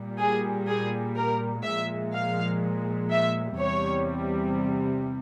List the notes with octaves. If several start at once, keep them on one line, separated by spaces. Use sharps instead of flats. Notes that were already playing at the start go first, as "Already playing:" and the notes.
Already playing: A#2 G3
G#4
G#4
A#4
A#2 F3 G#3 E5
F5
E5
E2 C3 G3 C#5